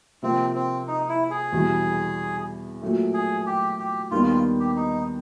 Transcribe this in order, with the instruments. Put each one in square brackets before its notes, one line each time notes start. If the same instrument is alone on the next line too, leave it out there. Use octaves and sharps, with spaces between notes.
[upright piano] C3 F3 A#3 [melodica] C4
[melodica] C4
D#4
E4
G#4
[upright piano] E2 B2 G3 B3
A#2 F#3 A3
[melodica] G#4
G4
G4
[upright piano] D#2 D#3 G3 B3 D4 [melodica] F4
[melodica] F4
G4
D#4